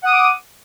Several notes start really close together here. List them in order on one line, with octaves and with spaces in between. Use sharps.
F#5 D#6 D6